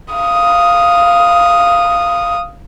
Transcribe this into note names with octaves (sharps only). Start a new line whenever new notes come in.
F5 D#6